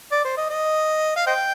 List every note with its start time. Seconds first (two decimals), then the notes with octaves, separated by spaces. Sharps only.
0.12 D5
0.24 C5
0.37 D#5
0.50 D#5
1.16 F5
1.27 C5 D#5 G5